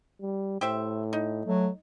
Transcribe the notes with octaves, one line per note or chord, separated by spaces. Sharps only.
G3
A2 G4 C5 E5
D#4
F#3 A3